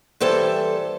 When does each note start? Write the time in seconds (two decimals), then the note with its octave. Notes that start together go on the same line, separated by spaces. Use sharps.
0.20 E3 G3 A4 C5 E5